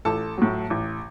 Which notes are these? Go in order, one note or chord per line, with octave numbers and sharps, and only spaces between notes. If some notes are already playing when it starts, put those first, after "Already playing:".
A1 A4 A5
A2 F#3
A1